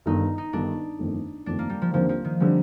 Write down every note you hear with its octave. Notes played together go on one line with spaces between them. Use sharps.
G1 G2 D#3 D#4
D#4
G1 G2 D#3 D4
G1 F2 D#3 A3
G1 F2 D#3 A3 D4
A#3
G3
F3
D#2 D3 F3 G3 C4
F3
D#3
D3 F3 G3 C4